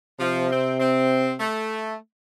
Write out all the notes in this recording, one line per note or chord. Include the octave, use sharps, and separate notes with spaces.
C3 F3
C4
C4
A3